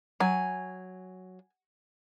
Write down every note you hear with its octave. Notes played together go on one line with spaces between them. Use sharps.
F#3 G#5